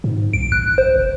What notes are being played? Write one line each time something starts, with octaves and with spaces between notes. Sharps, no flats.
G#2
C2 D7
A1 F#6
C5
F#1